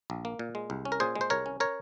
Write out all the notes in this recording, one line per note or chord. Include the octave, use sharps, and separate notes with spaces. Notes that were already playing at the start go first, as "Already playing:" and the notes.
A#1
A#3
A#2
G#3
C2
C#4
A#4
A#2 G#4 C5
G#3
C5
C2 A#4 C#5
C#4
A#4 C#5